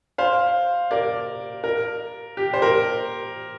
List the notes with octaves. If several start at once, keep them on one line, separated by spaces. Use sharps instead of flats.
C5 F5
A#4 D5
A#4
G4
C5
A#4